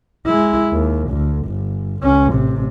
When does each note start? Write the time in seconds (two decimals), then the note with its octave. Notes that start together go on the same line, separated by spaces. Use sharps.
0.26 G#3 E4
0.71 D#2
1.09 D2
1.46 G1
2.03 C#2 C#4
2.33 A1 C3